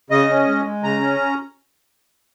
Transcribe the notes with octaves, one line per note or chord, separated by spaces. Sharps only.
C#3 D#5
C#4
G#3
G#3
C#3 A#5
C#4